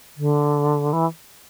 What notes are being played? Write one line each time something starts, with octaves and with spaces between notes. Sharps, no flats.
D3
E3